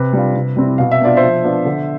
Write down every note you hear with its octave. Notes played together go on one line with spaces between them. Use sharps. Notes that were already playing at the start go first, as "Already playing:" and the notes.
Already playing: C3 B4
G3 D4 F4
C3
G3 C4 E4
B2 F5
E5
B3 D4 F4 D5
C5 E5
F3
B3 D4 F4
D3